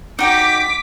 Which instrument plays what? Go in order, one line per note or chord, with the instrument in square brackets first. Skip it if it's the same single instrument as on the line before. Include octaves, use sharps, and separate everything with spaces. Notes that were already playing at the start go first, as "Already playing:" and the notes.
[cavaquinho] D#4 F#4 G5 [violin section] D6 B6